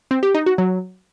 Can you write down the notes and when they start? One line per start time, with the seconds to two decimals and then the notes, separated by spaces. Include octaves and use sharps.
0.11 C4
0.23 G4
0.35 D#4
0.46 F#4
0.58 F#3